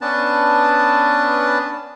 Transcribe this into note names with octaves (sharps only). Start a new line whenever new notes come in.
B3 C#4 D4 B4 A5